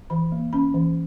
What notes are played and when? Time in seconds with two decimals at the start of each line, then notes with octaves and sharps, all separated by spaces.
0.10 E3 B5
0.32 A#3
0.53 C#4 B5
0.74 E3